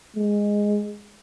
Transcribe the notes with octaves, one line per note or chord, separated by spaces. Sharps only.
G#3